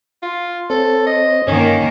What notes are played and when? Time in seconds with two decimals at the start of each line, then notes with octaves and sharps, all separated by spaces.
0.22 F4
0.70 C4 A4 C5 C#5
1.07 D#5
1.48 G2 D3 D#3 A#3 C#4